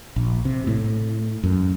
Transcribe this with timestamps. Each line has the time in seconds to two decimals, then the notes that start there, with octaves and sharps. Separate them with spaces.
0.16 A#1
0.45 C3
0.67 A2
1.44 F#2